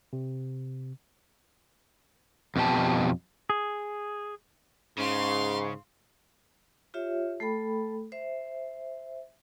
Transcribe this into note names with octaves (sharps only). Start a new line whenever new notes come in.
C3
F2 B2 G4 A5
G#4
G#2 C#3 F5 C6
F4 G4 C#5 E5
A3 A4 G5 B5
C5 E5